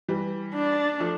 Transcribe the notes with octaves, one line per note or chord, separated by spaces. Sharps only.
E3 G3
D4
F3 A3